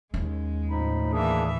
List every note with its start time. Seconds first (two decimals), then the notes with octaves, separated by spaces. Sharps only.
0.14 D#2 G#3 C#4
0.70 A2 F3 D#4 B5
1.12 E3 A#3 D4 G#4 E5